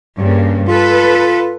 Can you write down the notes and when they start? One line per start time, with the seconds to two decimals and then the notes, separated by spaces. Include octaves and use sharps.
0.17 G2 C#3 A#3
0.68 F4 A4 B4